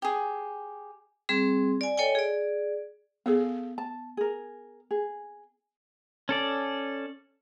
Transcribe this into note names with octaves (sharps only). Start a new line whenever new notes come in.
G4 G#4
G3 C4 G#4 C6
D5 G#5
A4 C#5 D#5 G5 G#5
G#4 D5
B3 G#4 A4 F5
A5
G#4 A#4
G#4
C#4 A4 D5